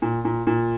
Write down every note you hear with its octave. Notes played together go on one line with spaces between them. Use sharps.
A#2
A#2
A#2